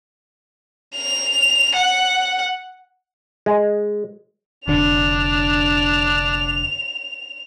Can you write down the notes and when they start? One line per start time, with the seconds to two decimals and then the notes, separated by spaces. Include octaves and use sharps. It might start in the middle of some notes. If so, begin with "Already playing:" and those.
0.96 F7
1.75 F#5
3.46 G#3
4.68 F1 D3 D4 F7